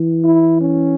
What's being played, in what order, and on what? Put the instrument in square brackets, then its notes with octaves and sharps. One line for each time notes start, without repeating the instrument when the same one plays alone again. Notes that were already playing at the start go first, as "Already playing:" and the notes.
Already playing: [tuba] E3
[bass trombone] E4
C#4